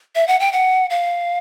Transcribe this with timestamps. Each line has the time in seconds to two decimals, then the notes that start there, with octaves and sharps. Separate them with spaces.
0.15 E5
0.28 F#5
0.40 G5
0.53 F#5
0.90 F5